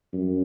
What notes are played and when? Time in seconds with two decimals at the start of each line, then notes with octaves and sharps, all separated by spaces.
0.13 F#2